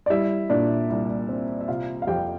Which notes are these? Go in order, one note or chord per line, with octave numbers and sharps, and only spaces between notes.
D5
G3 E4 E5
A#2 D4 D5
C2
C4
E5
C3 F4 F5
F5
F2 G4 G5